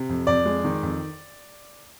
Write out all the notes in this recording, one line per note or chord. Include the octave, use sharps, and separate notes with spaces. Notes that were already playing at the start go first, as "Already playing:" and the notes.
Already playing: C3
F2
F2 D5
G#3
D#3
F2